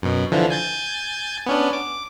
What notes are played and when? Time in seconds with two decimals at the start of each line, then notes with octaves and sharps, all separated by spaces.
0.02 F#2 B2
0.31 D3 E3 F3
0.50 G#5 G6 A6
1.46 B3 C#4 D4
1.73 D6